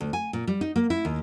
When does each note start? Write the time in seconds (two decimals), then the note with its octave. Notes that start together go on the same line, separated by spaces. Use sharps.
0.01 D2
0.13 G#5
0.33 A#2
0.47 G3
0.61 D#4
0.76 A#3
0.90 E4
1.05 D#2